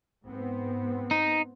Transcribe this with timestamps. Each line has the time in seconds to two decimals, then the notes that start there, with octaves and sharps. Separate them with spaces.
0.24 G#2 B3 C4
1.11 D#4